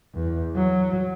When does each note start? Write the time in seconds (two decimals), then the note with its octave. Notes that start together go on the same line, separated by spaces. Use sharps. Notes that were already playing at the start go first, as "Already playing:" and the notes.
0.14 E2
0.55 F#3